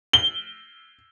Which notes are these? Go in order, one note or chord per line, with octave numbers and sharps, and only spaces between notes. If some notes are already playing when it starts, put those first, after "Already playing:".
G7